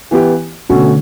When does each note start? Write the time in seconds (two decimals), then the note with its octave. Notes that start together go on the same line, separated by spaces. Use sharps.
0.11 E3 B3 E4 G4
0.69 B2 D3 A3 C#4 F#4